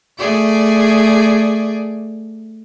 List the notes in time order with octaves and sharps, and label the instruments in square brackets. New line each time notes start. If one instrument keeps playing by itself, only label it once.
[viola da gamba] A3 G#4 D5